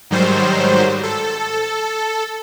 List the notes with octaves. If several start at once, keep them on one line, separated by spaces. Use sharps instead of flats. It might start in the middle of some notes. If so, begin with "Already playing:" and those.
G#2 D#3 F#3 G3 C5
A4